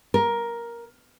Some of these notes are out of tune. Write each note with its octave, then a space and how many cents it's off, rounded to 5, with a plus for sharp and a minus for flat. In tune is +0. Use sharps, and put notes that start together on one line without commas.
A#4 +10